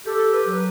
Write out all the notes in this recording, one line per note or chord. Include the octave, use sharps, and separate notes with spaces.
G4 A4
B4
F#3